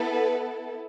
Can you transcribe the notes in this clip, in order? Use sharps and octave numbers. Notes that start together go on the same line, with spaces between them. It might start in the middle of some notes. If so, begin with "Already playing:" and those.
Already playing: B3 E4 A4
B4